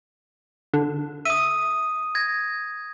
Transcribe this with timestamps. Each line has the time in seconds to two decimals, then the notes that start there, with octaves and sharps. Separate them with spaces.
0.74 D3
1.25 E5 D#6 D#7
2.15 G#6 A#6